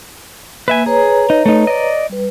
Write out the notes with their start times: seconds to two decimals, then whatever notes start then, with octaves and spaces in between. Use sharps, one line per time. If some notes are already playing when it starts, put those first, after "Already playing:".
0.68 A#3 B4 E5 G#5
0.86 G#4 B4 C#5 A#5
1.30 D#4
1.46 A3 D#4
1.67 D5 D#5
2.09 G3 B4